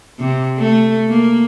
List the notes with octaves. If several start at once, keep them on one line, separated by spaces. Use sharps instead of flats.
C3
A3
A#3